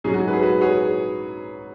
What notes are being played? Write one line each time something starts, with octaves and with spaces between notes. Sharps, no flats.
G#2 F#3 C#4 G#4
F#4
B4
G#4
F#4 B4
G#4 C#5